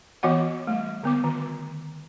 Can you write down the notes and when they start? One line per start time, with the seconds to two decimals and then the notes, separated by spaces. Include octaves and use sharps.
0.23 E3 B3 F#4 D#5 F#5
0.67 G3 A3
1.03 D3 B3 D6
1.24 D#3